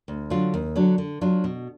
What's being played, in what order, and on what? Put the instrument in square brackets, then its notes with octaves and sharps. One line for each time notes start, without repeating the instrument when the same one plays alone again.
[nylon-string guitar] D2
D3 F#3 D4 F4
D#2
D3 F#3 D4
D3
F#3 D4 F4
B2